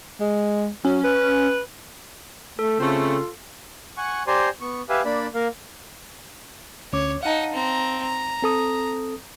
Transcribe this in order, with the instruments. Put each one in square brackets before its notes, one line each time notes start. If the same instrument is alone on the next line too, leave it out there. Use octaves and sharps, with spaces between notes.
[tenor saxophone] G#3
[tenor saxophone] F#3 [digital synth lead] C#4
[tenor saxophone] B4
[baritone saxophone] A3 [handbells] A4
[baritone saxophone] C#3 [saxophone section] A3 C4 [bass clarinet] F4
[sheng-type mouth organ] F#5 G#5 C#6
G4 C5 D5 G#5 A#5 C6
B3 C#6
G4 B4 E5 F5 G#5
A#3 D4 D5 B5
A#3 A#4 F5
[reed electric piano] D2 C#4 D6 [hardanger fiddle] C#5
[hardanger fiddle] D#4 F#5 [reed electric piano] F5 A5
[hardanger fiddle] C4 A#5
A#5
[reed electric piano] C4 A4 D#6